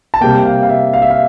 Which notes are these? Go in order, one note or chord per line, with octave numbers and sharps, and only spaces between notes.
A5
C3 G3 A#3 G5
G5
F5
F5
E5
F5
E5
F5